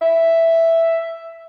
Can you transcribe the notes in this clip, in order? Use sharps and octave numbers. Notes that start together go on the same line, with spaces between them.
E5